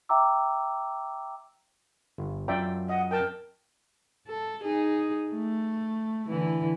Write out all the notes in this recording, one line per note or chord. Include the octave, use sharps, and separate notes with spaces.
E5 G5 A#5 D6 E6
G1
F#2 F4 D5 E5 G5 A#5
D#5 F#5
A#4 G5 A5
A4
D#4 G#4
A3
D3 E3 E4